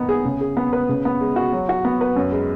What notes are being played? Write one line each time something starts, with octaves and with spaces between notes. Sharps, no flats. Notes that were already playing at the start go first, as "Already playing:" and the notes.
Already playing: D#3 B3 D#4
G#4
C#3
G#4
B3
B4
C#3
B3
G#3
F#4
F#3
F#4
B3
B4
F#2
G#3